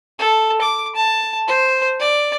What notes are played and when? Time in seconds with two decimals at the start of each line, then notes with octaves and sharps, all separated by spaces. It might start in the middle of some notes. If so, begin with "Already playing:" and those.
0.19 A4
0.61 D6
0.95 A5
1.48 C5
2.00 D5